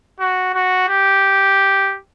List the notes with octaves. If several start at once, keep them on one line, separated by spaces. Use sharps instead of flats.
F#4
F#4
G4